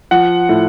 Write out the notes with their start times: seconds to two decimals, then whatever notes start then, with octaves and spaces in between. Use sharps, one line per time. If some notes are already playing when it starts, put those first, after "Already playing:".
0.11 F3 F#5
0.49 A2